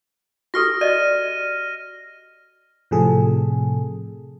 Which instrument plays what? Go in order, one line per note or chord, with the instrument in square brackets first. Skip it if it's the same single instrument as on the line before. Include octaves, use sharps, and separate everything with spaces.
[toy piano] F#4 G4 A4 [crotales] F6 A#6
[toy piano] D5 D#5 [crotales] D#7
[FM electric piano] A2 C3 F3 G#4 A4